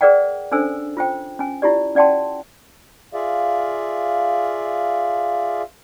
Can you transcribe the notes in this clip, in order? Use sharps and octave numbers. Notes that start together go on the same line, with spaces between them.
G#4 A#4 B4 D5 F#5 G5
C#4 D4 A4 C5 G#5 E6
F4 C5 G5
C#4 G#5
E4 F4 G4 D5
C#4 D5 F#5 G5 A5 C6
F4 G#4 D5 E5 F5